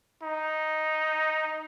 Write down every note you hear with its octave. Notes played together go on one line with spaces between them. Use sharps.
D#4